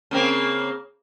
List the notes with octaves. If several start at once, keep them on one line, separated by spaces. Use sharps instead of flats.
C#3 A#3 C4